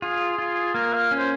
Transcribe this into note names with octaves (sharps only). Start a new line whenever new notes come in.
F4 G#4
F4
A#3 A#4
F5
C#4
C5